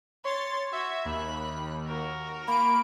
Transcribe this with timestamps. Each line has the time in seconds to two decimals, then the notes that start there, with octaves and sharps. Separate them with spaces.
0.25 C#5 C6 A6
0.73 F#4 E5 G#6
1.05 D#2 B5 F#6
1.86 F#4 A#4
2.48 A#3 B5 D7